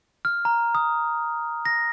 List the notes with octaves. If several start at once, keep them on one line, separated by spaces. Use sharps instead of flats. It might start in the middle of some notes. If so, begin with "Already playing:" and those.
F6
A#5
D#6
A#6